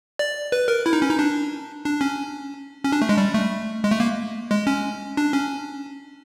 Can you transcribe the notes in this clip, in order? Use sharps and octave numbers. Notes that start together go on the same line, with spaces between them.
D5
B4
A#4
E4
D#4
C#4
D#4
D4
D4
C#4
C#4
D4
A3
G#3
G3
A3
G#3
A3
A#3
G#3
C#4
D4
C#4